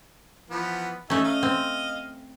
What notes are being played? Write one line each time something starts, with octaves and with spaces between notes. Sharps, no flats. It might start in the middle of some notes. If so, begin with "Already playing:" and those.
E3 F3 B3
A3 C#4 D#4 G#4 E5
D#5 F5
C4